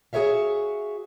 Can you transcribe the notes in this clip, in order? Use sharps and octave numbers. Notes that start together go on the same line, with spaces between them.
F#4 G#4 A#4 C#5 E5 F5